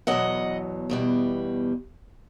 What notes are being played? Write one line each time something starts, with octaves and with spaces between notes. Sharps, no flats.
E2 B2 F#3 D#5 F#5
E2 B2 G3